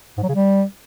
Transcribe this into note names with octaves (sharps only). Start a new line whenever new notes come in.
G#2
F#3
C#3
G3